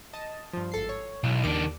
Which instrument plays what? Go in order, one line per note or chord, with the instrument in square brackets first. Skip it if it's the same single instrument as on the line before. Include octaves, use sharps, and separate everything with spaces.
[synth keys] D#5 A5
G2 F3
G#1 A4 C7
C#5
[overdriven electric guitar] B1 [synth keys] E3
[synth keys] D#2 D6 [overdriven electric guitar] D#3 D4